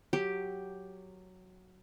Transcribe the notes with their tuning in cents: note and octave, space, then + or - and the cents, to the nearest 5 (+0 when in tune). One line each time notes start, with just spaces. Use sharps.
F#3 +0 G4 +0